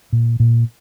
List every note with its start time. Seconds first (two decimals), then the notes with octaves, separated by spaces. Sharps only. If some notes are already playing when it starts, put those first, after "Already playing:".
0.13 A#2
0.40 A#2